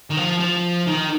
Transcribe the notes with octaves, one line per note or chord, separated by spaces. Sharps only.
D#3
F3
F3
D#3